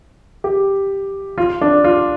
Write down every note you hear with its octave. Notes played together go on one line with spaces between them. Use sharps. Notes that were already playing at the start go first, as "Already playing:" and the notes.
G4
F4
D4
F4